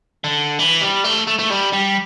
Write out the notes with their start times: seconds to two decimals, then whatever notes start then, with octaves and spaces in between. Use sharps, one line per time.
0.24 D3
0.59 E3
0.82 G3
1.04 A3
1.27 A3
1.38 A3
1.50 G3
1.73 G3